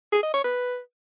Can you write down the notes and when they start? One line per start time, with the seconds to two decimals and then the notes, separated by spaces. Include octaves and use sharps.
0.12 G#4
0.23 D#5
0.34 C#5
0.44 B4